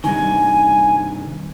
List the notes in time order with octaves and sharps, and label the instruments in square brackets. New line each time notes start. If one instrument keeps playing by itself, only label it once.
[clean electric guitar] G2 C3 D#3 [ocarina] G#5